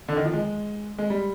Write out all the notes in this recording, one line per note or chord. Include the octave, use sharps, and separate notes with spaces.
D3
D#3
F3
G#3
G#3
G3